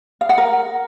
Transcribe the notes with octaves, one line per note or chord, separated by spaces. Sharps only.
F5
F#5
A#4